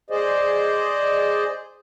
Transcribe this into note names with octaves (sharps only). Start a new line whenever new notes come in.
G#4 C5 D5 D#5